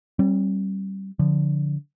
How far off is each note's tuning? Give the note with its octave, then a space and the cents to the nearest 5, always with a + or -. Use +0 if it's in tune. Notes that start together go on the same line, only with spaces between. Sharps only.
G3 -20 C4 +45
D3 -15 F3 +0